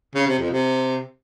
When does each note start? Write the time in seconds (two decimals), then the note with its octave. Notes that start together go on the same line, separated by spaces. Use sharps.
0.15 C#3
0.27 C3
0.39 F2
0.51 C3